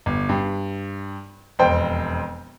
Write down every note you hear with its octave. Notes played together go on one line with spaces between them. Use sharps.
G1
G2
E1 F2 C5 G5